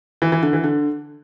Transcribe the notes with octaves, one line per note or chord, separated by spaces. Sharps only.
E3
E3
D3
E3
D3